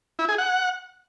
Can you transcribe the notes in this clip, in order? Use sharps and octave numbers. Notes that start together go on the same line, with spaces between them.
E4
G#4
F#5